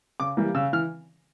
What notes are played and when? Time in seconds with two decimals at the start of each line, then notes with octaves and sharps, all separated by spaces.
0.20 C#3 D6
0.37 E3 G3 A#3
0.54 C#3 E6
0.73 E3 F6